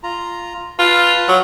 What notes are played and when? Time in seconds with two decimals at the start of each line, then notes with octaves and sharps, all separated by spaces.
0.03 F4 A#5
0.79 F4 B4 F5 A5
1.28 F#3